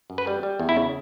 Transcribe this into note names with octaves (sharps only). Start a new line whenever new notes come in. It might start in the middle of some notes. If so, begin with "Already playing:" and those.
F#2
B4
G3
G3
E2
E4
C#3